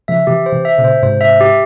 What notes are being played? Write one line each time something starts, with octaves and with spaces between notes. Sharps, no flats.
C#3 F3 E5
C3 E3 G4
C5
C3 E3
E5
A#2 C#3
C5
G#2 C3 C5
E5
G4